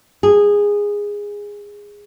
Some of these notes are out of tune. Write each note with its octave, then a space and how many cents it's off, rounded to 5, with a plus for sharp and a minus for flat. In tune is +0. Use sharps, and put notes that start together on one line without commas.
G#4 -15